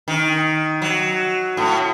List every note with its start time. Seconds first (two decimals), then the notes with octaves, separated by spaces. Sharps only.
0.08 D#3
0.82 F#3
1.57 A2